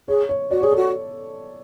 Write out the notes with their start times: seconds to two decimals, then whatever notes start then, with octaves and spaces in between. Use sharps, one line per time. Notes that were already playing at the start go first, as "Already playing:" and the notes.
0.08 G#4 C#5
0.29 C#5
0.51 F#4 D5
0.61 G#4 C#5
0.72 F#4 A4